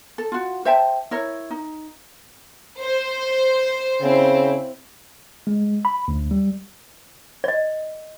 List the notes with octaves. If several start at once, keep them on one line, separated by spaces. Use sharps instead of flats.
A4
F4 F#4
C5 E5 G5 A5
E4 A#4 C#5
D#4
C5
C#3 C4 E4
G#3
B5
D2
G3
D5 D#5